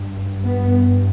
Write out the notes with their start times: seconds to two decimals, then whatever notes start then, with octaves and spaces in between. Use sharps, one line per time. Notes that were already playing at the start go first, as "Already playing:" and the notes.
Already playing: G2
0.44 B3